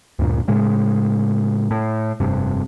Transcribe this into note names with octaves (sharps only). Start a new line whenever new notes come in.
D2 G2 A#2
A2 C#3 G#3
A2
F1 G2 C3